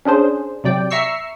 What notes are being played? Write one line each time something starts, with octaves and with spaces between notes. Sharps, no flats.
C#4 D4 G#4 C5
C3 F#3 D5 G5
E5 A#5 C#6 E6 C7